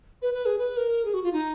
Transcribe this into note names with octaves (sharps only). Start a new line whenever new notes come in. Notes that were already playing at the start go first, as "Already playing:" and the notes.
B4
B4
G#4
B4
A#4
G#4
F#4
F4
D#4